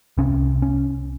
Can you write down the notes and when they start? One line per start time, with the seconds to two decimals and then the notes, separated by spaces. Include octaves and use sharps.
0.18 C2 C3 C#4
0.62 C#4